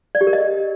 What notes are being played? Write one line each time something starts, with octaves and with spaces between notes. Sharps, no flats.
D5
G4
A#4
D#5